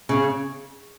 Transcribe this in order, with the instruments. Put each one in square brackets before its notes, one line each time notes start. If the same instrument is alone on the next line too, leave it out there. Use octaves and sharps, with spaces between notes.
[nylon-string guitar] C#3